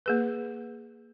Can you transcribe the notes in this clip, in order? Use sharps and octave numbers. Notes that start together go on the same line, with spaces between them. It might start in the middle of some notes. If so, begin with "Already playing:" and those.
A#3 G#4 B4